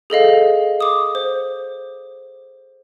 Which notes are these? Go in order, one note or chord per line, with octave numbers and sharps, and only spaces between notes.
G#4 A4 D#5 F5
D6 D#6
C5